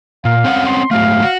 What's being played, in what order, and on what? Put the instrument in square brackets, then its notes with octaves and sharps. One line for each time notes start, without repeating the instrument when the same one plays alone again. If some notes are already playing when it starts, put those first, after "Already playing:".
[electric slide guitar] A#2 [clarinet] F5
[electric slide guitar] C4 C#4 F#5
[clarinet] C6
[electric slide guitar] G#2 F#3 A3 [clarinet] F5
[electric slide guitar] F#4